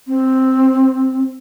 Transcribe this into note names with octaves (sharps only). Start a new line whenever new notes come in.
C4